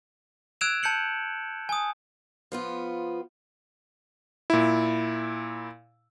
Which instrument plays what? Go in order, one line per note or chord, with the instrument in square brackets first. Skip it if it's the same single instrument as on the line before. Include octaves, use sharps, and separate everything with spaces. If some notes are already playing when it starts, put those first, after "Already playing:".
[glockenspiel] E6 F#6 G#6 D7 E7 F7
A5 G6 C#7 F#7
G#5 D#6
[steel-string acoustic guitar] F3 B3 F4
[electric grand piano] A#2 E4